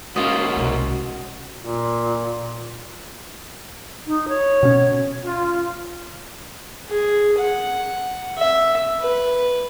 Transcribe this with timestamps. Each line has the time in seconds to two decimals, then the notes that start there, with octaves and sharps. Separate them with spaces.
0.16 G#2 A#3 C#4 F4 F#4 D#5
0.56 C2 B2
1.60 A#2
4.06 D#4
4.28 C#5
4.63 B2 C#4
5.25 F4
6.90 G#4
7.39 F#5
8.38 E5
9.01 B4